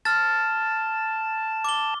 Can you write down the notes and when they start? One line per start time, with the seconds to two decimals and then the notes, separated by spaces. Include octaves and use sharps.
0.05 A5 F6 A6
1.64 D6 G7